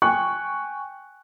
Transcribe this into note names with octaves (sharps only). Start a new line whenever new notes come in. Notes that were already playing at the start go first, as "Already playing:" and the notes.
G5 G#5 C#6 F#6